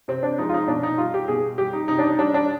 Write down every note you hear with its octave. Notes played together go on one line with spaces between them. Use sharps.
C3 C4
D4
F3 G#3 D#4
F4
D#4
B2 D4
D#4
G3 F4
G4
B2 G#4
G3 G4
D#4
C3 D#4
D4
D#4
G3 D4
D4